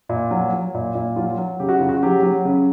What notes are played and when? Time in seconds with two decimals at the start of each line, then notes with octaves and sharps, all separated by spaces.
0.09 A#2
0.31 F#3
0.53 F#3
0.74 A#2
0.95 A#2
1.16 F#3 F4
1.38 F#3
1.59 C#3 G4
1.69 F#4
1.79 C#3 F4
1.89 F#4
2.03 F#3 G4
2.23 F#3
2.45 C#3